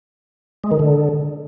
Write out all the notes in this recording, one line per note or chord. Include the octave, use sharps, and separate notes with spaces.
G#3
D#3
D3